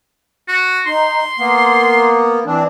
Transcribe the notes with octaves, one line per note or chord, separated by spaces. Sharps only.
F#4
D#4 C6
A#3 B3
E3 C4 D4